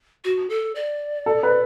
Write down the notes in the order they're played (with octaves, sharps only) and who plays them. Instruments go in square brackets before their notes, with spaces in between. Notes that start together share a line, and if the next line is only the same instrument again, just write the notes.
[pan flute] F#4
A4
D5
[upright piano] A4
B4